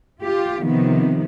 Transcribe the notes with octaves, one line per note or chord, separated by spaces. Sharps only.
F4 G4
C3 D#3 F3 B3